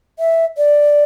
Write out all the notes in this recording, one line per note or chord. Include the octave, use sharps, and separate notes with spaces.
E5
D5